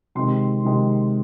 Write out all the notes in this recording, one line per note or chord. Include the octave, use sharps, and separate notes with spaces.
C3 D#3 G#3 C4 C6
C3 D#3 G#3 C4